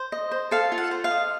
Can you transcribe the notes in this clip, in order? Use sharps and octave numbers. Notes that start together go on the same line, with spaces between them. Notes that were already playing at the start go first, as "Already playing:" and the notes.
Already playing: C5
D#5
C5
A4 F5
F4
F#5
C5
F5
D#5